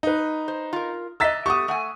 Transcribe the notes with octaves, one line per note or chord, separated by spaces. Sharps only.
D#4 B4
C5
F4 A#4
D#5 E5 A#5 E6 A6 B6
A3 B3 G4 C#6 D#6
A3 F#5 G#5